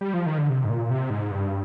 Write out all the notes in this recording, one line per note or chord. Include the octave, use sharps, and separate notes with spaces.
G3
F3
D#3
D3
C3
G#2
A#2
C3
G#2
G2